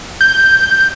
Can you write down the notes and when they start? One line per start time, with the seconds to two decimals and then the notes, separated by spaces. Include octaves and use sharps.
0.21 G6